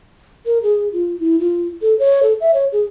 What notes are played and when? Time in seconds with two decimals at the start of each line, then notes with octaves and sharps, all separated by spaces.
0.46 A#4
0.63 G#4
0.93 F4
1.20 E4
1.39 F4
1.82 A4
1.99 C#5
2.23 A4
2.40 E5
2.54 C#5
2.73 G#4